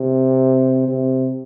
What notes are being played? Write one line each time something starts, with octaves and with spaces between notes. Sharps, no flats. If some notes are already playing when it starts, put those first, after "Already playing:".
Already playing: C3
C3